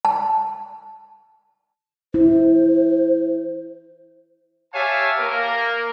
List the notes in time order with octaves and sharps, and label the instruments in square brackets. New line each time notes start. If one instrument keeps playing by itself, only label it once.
[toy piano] A5
[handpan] E4 [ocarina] C5
[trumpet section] G4 C#5 E5 F5 G#5 A5
A#3 A#4